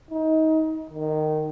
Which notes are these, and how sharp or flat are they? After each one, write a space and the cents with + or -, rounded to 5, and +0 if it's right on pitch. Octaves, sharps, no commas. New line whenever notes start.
D#4 +25
D#3 -15